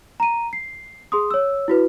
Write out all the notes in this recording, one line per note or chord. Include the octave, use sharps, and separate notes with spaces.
A#5 D#7
C7
G#4 C6 D#6
C#5 E6
E4 F#4 B4